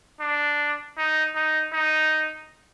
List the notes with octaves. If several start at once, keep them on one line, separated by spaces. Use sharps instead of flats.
D4
D#4
D#4
D#4